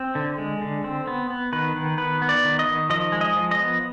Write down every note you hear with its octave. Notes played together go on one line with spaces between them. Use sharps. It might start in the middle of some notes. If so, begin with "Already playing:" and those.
Already playing: C4
D3
G#3
D3
C4
B3
B3
D#3 B4
D#3
B3 B4
B3
D5
D#3
D#5
D#3
F3 D#5
G#3
D#5
F3
D#5
B3